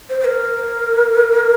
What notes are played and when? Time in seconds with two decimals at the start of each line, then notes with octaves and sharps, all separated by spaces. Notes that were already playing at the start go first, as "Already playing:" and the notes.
0.09 C5
0.20 C5
0.25 A#4